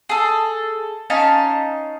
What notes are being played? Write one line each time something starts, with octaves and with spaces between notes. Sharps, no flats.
G#4 A4
C#4 D#4 F5 A5